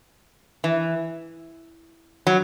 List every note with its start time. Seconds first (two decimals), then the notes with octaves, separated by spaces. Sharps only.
0.64 E3
2.27 F#3